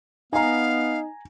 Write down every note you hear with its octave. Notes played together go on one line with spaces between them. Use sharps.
B3 D#4 F5 G#5 A#5